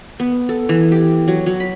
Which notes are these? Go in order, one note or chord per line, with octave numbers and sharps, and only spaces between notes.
B3
A4
E3
G4
F#3
F#3
B5